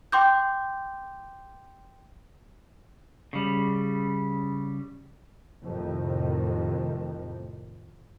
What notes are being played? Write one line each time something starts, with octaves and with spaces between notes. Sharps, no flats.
G5 C6 D6 G6
C#3 G3
F2 A2 C3 D#3